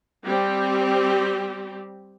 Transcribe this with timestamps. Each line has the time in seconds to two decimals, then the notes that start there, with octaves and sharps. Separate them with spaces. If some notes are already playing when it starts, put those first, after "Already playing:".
0.24 G3 C4 G4